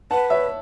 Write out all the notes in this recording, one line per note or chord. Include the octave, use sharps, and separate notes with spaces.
B4 F#5 A5
C#5 E5